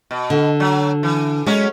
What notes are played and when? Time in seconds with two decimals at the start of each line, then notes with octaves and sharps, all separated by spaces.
0.11 B2
0.30 D3
0.60 F#3
1.03 E3
1.46 F#3 G#3 C#4 C#5